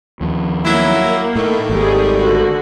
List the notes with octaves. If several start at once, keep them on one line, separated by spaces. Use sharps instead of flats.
D#2 F3
F#3 A#3 E4
A2 D#3 A3
G#1 G3 G#4
D3 F#4